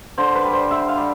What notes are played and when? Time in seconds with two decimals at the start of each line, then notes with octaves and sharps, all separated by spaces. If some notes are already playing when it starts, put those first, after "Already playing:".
0.18 D3 C5
0.35 B4
0.44 G3
0.53 C5
0.71 D3 E5
0.88 F5
0.97 G3